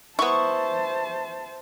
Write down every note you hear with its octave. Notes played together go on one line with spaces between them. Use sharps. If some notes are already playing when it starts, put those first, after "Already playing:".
B3 E4 C5 A5 C#6